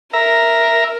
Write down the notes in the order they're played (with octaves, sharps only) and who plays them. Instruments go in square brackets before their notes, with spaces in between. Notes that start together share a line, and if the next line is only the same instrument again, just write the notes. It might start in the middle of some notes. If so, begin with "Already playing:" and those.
[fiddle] A#4 [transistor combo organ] E5 A#5